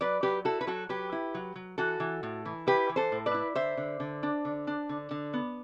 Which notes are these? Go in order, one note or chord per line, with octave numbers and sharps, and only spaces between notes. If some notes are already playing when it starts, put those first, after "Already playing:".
F#3 B4 D5
F#3 G4 B4
E4 F#4 A4
B4
F#3 F#4 A4
F#3 G4 B4
E4
F#3
F#3
E3 F#4 A4
E3
A2
E3
E4 G4 B4
E3
A4 C5
A2
B4 D5
E4
D3 C5 E5
D3
D3
D4
D3
D4
D3
D3
B3